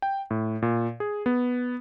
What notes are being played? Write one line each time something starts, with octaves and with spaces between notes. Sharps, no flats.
G5
A2
A#2
G#4
B3